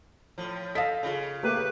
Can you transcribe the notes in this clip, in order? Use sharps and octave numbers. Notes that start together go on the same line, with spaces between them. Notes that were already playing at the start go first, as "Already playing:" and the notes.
A2 F3
A4 D#5 F5 A5 B6
C#3 F4
A3 A#3 G4 B4